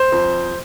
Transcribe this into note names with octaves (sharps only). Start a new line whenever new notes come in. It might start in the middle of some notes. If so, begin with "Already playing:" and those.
Already playing: C5
F2